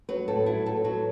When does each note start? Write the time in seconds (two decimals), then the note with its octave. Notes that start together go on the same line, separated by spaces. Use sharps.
0.09 F#3 B4
0.28 A2 A4
0.46 F#3 E4
0.66 A2 A4
0.84 F#3 B4